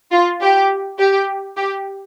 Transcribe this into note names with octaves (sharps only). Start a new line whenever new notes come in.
F4
G4
G4
G4